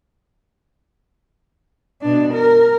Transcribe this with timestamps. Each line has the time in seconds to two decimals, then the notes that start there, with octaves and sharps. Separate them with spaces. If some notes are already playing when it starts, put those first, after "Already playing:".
2.01 B2 D4
2.34 A#4